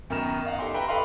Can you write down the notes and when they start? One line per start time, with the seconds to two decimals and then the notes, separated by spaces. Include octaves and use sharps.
0.10 F#2 D#3 B3 A#5 F6 E7
0.45 D#5 F5 F#5
0.59 D#4 G4 A4 E5 G5 C6
0.74 B4 E5 G5 A#5 B5
0.88 G4 A4 B4 D#5 F5 C6